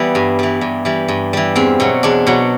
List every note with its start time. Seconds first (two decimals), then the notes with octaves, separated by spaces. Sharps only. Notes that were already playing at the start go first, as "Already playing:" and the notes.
Already playing: E3 G3 B3
0.15 G2
0.39 E3 G3
0.61 G2
0.85 E3 G3
1.08 G2
1.33 E3 G3
1.56 E2 C4
1.80 B2 F#3
2.03 E2 D4
2.27 B2 F#3